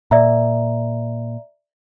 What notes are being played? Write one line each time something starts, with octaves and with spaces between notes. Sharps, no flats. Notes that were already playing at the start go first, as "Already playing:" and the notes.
A#2 D5 E5 A#5